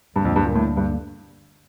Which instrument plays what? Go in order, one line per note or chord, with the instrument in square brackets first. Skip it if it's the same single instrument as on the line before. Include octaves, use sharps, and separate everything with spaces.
[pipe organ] D2 D3 G3 A#3 D4 [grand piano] G2
[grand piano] F2
G2
A#2
A2
G2